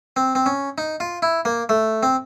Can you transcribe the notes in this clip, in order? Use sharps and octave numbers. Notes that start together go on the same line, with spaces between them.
C4
C4
C#4
D#4
F4
E4
A#3
A3
C4